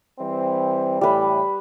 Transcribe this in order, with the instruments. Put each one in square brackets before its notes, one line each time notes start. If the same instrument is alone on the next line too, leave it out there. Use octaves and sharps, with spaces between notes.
[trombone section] E3 G3 C4
[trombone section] A2 E3 [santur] G3 B4